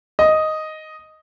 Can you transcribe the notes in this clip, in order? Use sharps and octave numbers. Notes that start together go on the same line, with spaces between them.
D#5